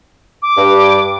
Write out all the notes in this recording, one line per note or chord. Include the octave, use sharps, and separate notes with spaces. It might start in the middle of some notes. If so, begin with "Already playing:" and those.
D6
G2